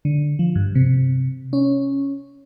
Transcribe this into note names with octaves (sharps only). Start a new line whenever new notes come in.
D3
F3
G2
C3
C#4